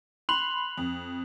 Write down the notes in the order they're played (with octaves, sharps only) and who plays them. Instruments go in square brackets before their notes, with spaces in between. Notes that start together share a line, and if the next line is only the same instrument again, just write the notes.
[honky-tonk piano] B5 C6 [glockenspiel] F#6 F7 F#7
[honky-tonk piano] F2